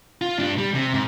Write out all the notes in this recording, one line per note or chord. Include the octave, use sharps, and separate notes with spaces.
F4
G2 D4
G3
C3
G#2